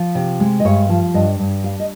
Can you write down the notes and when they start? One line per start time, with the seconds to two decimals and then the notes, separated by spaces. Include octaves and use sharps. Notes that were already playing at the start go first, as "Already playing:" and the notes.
Already playing: F3
0.15 C3
0.40 G#3
0.60 D#5
0.65 G2 C#5
0.89 F3
1.14 G2 D#5
1.39 G2
1.63 G3 F5
1.80 D#5